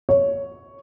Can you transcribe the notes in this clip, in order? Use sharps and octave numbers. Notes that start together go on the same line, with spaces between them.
C#5